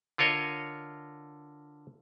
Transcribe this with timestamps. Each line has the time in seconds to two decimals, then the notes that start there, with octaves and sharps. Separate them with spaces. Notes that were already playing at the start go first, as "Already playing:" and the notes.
0.18 D3 F4 A#4 C#5 D#5